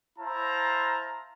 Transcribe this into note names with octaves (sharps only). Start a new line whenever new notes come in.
E4 C5 F5 A5 A#5